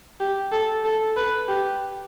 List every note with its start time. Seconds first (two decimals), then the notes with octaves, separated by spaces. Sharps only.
0.20 G4
0.52 A4
0.84 A4
1.16 B4
1.48 G4